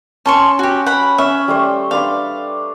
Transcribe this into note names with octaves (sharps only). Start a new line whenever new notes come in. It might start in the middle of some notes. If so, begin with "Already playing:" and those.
C#4 A5 C6 C#6
F#4 G4
F#5 B5
C#4 E5 B5
G3 A3 C5
D4 B4 F5 C6